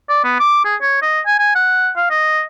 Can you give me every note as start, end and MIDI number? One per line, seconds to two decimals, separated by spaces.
0.09 0.21 74
0.24 0.38 59
0.39 0.64 86
0.65 0.76 68
0.81 0.99 73
1.02 1.20 75
1.26 1.35 80
1.39 1.53 80
1.55 1.90 78
1.96 2.08 77
2.10 2.43 75